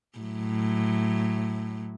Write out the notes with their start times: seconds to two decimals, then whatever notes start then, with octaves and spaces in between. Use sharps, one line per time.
0.19 A2 F#3